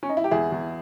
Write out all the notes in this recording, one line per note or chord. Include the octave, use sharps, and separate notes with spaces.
C#4
D#4
E4
G4
E2 E4 G#4
E2